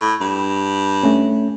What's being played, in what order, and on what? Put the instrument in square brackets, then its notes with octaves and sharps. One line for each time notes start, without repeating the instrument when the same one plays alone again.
[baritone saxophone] A2
G2
[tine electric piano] A3 C#4